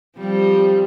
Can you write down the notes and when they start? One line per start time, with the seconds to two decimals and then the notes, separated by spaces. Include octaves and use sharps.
0.18 F3 G3 C4